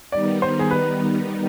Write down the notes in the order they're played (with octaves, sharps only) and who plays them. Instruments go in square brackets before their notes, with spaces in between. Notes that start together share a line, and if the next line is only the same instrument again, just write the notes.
[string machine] D#3 G3 B3 D#4 [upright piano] D5
[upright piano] C5
G#4
B4